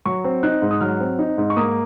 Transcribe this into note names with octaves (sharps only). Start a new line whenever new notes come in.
F#3 C#6
C4
D#4 F#6
G#2
D#6
F#3 F6
C4
D#4
G#2
C#6
A#3 D#6